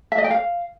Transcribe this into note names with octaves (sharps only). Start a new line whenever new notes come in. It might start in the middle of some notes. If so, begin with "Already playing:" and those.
E5
D#5
G5
F5